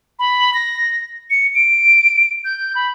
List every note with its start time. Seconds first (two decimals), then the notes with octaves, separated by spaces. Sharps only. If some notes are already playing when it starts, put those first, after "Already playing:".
0.19 B5
0.54 A#6
1.30 C#7
1.55 D7
2.44 G6
2.75 B5